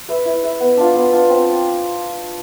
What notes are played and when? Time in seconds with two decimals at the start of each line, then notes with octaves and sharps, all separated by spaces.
0.08 B4 E5
0.25 E4
0.43 B4 E5
0.60 B3
0.77 D4 F4
0.95 B3
1.12 D4 F4
1.30 C4